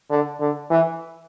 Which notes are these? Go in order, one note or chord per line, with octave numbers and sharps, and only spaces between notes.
D3
D3
E3